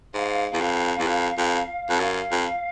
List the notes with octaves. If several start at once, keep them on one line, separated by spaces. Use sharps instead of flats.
G#2 F5
E2
F2
E2
F2
F2
F2
F#2 F5
F2